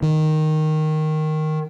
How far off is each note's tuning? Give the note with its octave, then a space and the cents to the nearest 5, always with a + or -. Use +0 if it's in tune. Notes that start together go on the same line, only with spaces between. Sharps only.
D#3 -5